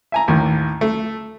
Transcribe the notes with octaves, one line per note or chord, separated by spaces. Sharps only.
E5 G#5 A#5
A1 D#2 A2
A3